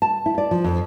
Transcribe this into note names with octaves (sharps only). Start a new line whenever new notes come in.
A5
E4
D5
F3
F2